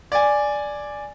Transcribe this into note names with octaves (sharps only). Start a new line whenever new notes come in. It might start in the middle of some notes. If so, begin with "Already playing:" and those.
D5 G#5